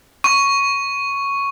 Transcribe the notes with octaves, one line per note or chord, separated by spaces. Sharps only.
C#6